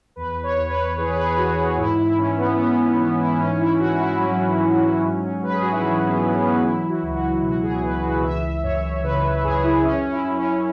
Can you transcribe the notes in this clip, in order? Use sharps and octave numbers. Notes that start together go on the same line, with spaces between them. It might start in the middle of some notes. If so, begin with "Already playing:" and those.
E2 B4
C#5
E2
B4
E3 G#4
B4
G#4
E3 F#4
G#2 E4
E4
G#2 C#4
B3
E3 B3
C#4
E3 B3
E4
G#2 C#4
E4
G#2 F#4
E4
F#3 C#4
F#3
G#2
G#2 B4
G#4
F#4
E4
E3 C#4
B3
E3
B3
C#4
F#3 E4
F#4
C#2
F#4
B2 F#4
G#4
C#2 B4
F#4
E3 E5
F#2 C#5
C#3 B4
F#2 G#4
E4
F#2 C#4
E4
F#2
C#4